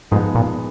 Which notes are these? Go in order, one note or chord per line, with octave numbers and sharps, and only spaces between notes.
G#2 F3 G#3 B3 D#4 G#4
A#2